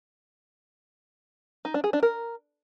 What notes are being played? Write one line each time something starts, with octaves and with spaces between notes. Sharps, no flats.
D#4
D4
G#4
D4
A#4